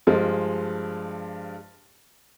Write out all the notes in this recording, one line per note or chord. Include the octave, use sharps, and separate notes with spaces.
G2 F3 G#3